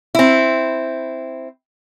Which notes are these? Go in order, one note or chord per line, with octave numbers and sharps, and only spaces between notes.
C4 E4